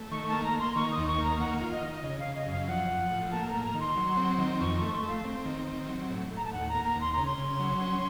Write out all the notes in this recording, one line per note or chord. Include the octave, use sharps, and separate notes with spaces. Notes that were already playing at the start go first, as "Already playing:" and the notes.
Already playing: A3
D#3 C#6
A#3 A5
A#5
A#3
C6
D#3 C#6
D#6
D#2
C#6
A#3
A#5
D#3 F#5
F4
D#5
D#3
D#5
C#3 D#5
F5
C#3
D#5
F#2
F5
F3 F#5
F3
A2
A#3 A5
A#5
A#3
A#5
D#3
C6
F#3
C4
D#3
F2 C#6
C#6
A3
C6
A3
F5
C4
D#3
C4
F#3
A2
A2
A#5
A5
D#2 F#5
A#5
A#3
A#5
D#2
C6
C#3 A#5
C6
C#3
F#3
C#4